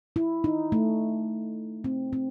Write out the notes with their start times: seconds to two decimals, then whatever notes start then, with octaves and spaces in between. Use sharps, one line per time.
0.16 E4
0.44 D#4
0.72 A3
1.84 C4
2.13 C4